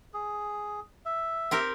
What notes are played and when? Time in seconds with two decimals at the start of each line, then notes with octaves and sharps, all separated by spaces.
0.14 G#4
1.06 E5
1.51 C4 G4 A#4